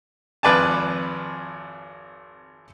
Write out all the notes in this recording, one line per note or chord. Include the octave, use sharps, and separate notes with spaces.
G#1 F2 B4 D5 G#5 A5